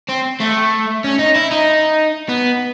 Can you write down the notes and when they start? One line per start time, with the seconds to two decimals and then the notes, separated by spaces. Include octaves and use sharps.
0.09 C4
0.40 A3
1.04 C#4
1.19 D#4
1.36 E4
1.51 D#4
2.29 B3